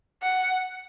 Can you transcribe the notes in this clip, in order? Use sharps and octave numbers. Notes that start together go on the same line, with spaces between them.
F#5